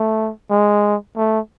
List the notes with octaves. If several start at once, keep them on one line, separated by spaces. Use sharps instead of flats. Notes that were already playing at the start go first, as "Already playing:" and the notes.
Already playing: A3
G#3
A3